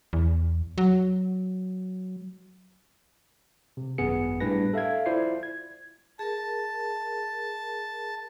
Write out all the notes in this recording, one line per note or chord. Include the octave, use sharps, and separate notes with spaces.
E2
F#3
C3
G#1 F#2 B3 G#4 C#7
A2 G3 D4 B4 A#6
A4 E5 F5 G#6
E4 F4 C5 D5 C7
G#6
G#4 A#4 A5